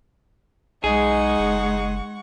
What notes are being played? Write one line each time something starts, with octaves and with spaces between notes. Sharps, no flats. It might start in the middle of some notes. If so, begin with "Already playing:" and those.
B1 G#3 D#4 G#4 F#5 C#6
F#1